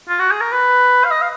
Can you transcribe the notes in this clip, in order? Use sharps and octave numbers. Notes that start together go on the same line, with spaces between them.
F4
F#4
G#4
A#4
B4
F5
D#5
F5